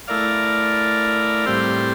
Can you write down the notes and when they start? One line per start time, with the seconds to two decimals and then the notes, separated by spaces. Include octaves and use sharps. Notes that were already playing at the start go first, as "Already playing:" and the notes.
0.08 A3 E4 A#4 D5 F5
1.46 A2 G3 C4 G4 C5